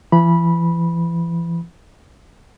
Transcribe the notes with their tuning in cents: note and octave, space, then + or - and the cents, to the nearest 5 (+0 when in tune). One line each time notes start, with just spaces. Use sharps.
E3 +40 B5 -15